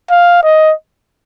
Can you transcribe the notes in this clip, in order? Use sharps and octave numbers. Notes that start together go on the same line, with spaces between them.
F5
D#5